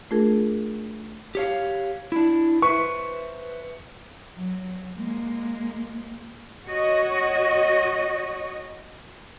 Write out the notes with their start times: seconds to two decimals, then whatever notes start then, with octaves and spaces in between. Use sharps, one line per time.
0.11 A3 D4 F4 G#4 A#4
1.35 G4 C#5 F5
2.12 D4 E4
2.62 B4 C5 E5 C#6
4.37 F#3
4.97 G#3 A#3
6.67 F#4 C#5 D#5